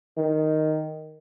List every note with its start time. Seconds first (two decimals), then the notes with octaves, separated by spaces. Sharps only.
0.18 D#3